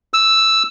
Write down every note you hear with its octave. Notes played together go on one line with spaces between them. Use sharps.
E6